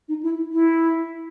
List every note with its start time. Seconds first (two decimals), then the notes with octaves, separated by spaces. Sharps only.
0.08 D#4
0.23 E4
0.53 E4